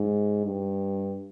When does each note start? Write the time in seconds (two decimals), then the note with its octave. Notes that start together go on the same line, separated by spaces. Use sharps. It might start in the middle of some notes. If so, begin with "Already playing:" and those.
Already playing: G#2
0.45 G2